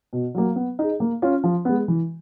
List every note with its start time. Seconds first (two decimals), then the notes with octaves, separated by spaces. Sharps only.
0.13 B2
0.35 F#3 A#3
0.56 B3
0.79 D#4 G#4
1.00 A#3
1.22 C#4 F4
1.44 F3
1.65 G#3 B3
1.88 E3